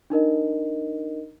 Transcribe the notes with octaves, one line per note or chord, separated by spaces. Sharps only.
D4 D#4 A#4 D#5